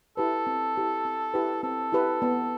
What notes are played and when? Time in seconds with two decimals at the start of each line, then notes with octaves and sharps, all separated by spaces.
0.17 E4 G4 A4 B4
0.47 C4
0.76 E4 G4 B4
1.05 C4
1.34 E4 G4 B4
1.63 C4 A4
1.93 E4 G4 B4
2.22 B3